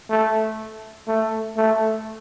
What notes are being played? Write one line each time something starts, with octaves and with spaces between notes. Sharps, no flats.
A3
A3
A3